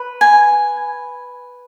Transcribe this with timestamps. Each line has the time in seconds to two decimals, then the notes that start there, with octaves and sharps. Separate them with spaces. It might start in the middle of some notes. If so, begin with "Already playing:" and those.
Already playing: B4
0.21 G#5